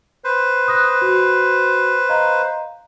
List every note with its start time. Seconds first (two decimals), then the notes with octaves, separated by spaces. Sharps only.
0.24 B4 C5
0.68 D#6 F#6 A#6
1.02 F#4
2.09 D#5 F5 A#5